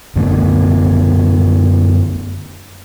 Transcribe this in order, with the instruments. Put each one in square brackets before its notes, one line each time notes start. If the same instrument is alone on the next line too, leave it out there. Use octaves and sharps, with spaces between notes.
[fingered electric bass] F#2 D3 A3 B3